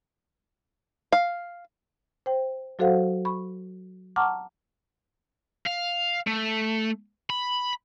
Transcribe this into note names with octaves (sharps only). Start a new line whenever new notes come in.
F5
C5 G5
F#3 F#4 A4 C5 F5 F#5
B5 C#6
F#5 A5 A#5 C#6 D6 F6
F5
A3
B5